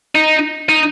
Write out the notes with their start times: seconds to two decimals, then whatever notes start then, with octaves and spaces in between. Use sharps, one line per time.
0.15 D#4
0.69 D#4